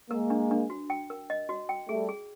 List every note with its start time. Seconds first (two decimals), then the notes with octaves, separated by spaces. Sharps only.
0.10 G#3 A#3 A#4
0.30 D4
0.51 D4
0.70 F#4
0.90 G5
1.10 A#4
1.30 D#5
1.49 F#4
1.69 G5
1.89 G3 A3 G#4
2.09 G#4